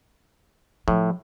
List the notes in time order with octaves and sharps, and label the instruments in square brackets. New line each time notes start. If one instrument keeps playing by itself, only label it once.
[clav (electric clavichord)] A2 [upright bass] F3